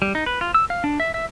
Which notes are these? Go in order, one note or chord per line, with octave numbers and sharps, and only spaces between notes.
G3
D#4
B4
F4
E6
F5
D4
E5
E5